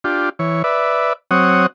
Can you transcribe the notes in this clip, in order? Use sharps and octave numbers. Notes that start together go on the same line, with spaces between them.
D4 F4 G4
E3 C#5
B4 D5 E5
F#3 C4 C#5 F#5 D#6